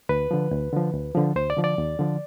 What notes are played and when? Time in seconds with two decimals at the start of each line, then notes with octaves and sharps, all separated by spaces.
0.09 D2 B4
0.31 D3 F3
0.51 D2
0.73 D3 F3
0.93 D2
1.15 D3 F3
1.36 D2 C5
1.50 D5
1.57 D3 F3
1.64 D5
1.78 D#2
1.99 D3 F3